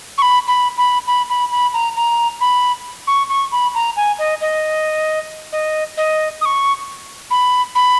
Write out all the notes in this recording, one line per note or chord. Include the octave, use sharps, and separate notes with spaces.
C#6
B5
B5
B5
B5
B5
B5
A#5
A#5
B5
C#6
C#6
B5
A#5
G#5
D#5
D#5
D#5
D#5
D#6
C#6
B5
B5